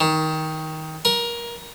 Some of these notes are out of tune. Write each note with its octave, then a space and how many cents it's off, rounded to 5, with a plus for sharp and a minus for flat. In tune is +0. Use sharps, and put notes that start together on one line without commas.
D#3 +15
A#4 +20